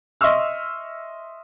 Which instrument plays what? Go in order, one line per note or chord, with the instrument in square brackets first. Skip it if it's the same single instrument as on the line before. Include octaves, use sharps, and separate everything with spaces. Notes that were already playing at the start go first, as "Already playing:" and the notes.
[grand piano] D#5 E5 C6 C#6 E6 F6